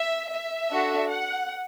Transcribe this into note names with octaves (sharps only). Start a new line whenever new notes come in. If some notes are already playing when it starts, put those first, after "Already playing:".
Already playing: E5
E5
D4 F#4 A4
F#5